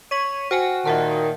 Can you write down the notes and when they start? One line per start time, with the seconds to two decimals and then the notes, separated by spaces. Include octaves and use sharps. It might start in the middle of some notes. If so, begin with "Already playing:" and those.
0.11 C#5 C#6 B6 D#7
0.51 F#4 C5 G5 G#5
0.85 A#2 D#3 E5 F#5 A5